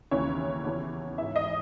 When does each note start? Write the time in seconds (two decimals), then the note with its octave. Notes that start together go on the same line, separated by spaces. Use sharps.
0.11 D#2 C#3 E3 C#5
0.64 E2 C#3 E3
1.18 G#2 E3 E5
1.36 D#5